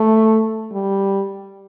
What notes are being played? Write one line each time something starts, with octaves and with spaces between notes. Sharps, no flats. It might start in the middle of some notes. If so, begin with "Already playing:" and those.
Already playing: A3
G3